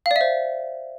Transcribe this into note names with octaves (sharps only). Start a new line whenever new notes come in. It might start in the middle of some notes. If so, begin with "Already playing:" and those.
F5
D5
E5
C5